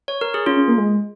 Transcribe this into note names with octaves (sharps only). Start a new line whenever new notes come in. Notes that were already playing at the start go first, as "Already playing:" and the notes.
C#5
A#4
G#4
C#4 F4
C#4
A#3
G#3